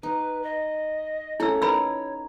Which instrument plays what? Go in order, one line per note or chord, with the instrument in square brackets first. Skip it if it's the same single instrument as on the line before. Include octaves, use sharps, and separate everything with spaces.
[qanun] D#4 [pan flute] B4
[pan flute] D#5
[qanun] A3 C#4 A4 [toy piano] E4 E6 [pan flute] C#5
[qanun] D#4 A#4 [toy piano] B4 B5 E6